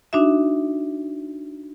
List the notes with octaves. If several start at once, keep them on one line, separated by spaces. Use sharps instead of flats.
D4 D#4 F#4 E5